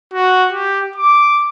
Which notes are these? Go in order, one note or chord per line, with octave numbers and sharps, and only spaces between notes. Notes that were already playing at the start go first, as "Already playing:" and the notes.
F#4
G4
D6